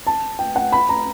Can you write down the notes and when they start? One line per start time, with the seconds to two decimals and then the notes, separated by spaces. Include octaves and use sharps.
0.07 A5
0.39 G5
0.56 F#5
0.72 B5
0.89 A#5